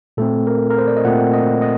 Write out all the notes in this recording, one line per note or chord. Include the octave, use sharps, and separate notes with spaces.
A#2 A3 C4 A4
A#4
A#4
C5
D5
D#5
A#2 A3 C4 F#5
D#5
D#5